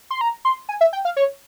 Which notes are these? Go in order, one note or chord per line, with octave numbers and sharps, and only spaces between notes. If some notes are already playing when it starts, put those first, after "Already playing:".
C6
A#5
C6
G#5
E5
G5
F5
C#5